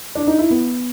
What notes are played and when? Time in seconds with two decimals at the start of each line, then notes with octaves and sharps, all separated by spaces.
0.15 D4
0.27 D#4
0.39 E4
0.50 B3